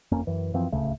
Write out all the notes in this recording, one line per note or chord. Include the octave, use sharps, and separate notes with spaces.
F#1 F2 A#3 C#4
F#2 E3
F#2 E3 F3 C4
D1 C#2 C#3 A3